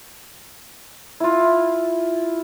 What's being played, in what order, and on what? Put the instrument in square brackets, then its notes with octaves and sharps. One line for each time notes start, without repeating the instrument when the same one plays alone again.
[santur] E4 F4